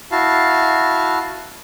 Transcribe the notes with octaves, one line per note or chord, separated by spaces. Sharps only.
E4 F#4 F5 A5